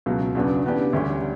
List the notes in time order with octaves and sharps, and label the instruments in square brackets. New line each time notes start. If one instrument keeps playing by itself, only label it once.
[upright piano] C#2 B2 F#3
E2 C#3 F#3 B3 D4
C#3 E3 B3 D4 G4
D2 D3 G3 C#4 G4